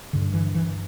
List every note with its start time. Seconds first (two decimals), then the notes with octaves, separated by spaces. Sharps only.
0.13 G2 D3
0.34 E3
0.55 E3